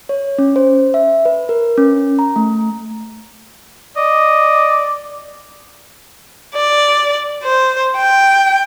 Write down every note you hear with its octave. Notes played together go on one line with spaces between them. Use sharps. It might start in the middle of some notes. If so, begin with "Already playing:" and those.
C#5
C#4
C5
E5
B4
A#4
C#4
A#5
A3
D5 D#5
D5
C5
G5